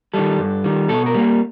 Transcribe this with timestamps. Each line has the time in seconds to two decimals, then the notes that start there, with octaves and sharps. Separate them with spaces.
0.14 D#3 G3 A4
0.39 G2
0.64 D#3 G3
0.89 B2 A4
1.06 A#4
1.14 G3 A#3